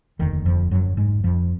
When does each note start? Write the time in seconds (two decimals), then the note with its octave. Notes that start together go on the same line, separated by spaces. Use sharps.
0.19 F1 D#2 D3 D#3
0.46 F2 F3
0.71 F#2 F#3
0.97 G#2 G#3
1.24 F2 F3